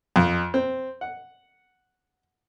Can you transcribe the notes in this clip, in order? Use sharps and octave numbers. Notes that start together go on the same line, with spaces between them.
F2
C4
F#5